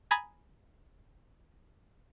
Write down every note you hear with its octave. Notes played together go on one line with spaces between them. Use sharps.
G#5 A#5 B5 D#6 G#6 A6